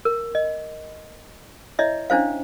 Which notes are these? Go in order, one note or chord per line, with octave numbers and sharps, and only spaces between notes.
A#4
D#5
E4 C#5 D#5 E5
C#4 D4 E4 C5 F5